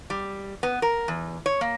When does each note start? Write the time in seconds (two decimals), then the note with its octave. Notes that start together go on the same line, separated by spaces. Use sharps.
0.10 G3
0.63 B3
0.82 A#4
1.08 E2
1.46 C#5
1.61 A#3